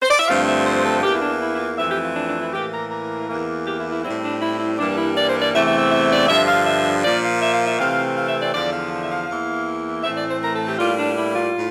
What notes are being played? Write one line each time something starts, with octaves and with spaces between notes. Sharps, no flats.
C5
D5
E5
G2 D3 F3 A3 C4 F5
E5
C5
A4
E2 E3 A#3 G4
E4
D4
E4
E4
F4
F2 E3 A3 C4 E5
G4
F4
D4
D4
E4
A2 E3 A#3 G4
A#4
A#4
E2 E3 A#3
G4
E4
E4
A2 G3 C4 E4
D4
E4
E4
G2 E3 G3 A#3 D4
E4
D5
C5
D5
E2 C3 E3 A3 C4 E5
E5
E5
E5
D5
G2 D3 F3 E5
F5
E5
A#2 F3 A#3 D5
F5
E5
F5
E5
C3 E3 A3 C4 F5
F5
E5
D5
E2 D3 F3 D5
F5
E5
F5
E2 E3 A#3
A2 E3 A3 C4 E5
D5
C5
A#4
A4
G4
A2 G3 A#3 F4
D4
E4
F4
A2